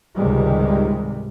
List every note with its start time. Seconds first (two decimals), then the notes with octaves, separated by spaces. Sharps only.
0.17 C#2 G#2 C3 D#3 G3 G#3